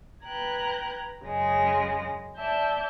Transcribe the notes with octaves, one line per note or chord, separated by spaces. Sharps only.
B4 G5 A#5 F#6 G#6
F#2 C#3 G#3 A#6
D5 E5 A5 G6